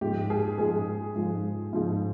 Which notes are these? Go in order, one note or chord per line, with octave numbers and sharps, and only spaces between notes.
G#2 F3 G#3 G4
G#4
G#2 F3 G#3 G#4
G#2 F3 G#3
G#2 F3 G#3